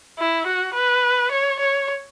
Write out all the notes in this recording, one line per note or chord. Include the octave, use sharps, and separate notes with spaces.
E4
F#4
B4
C#5
C#5